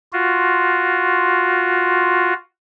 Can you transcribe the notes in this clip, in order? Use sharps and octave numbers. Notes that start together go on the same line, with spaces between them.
F4 F#4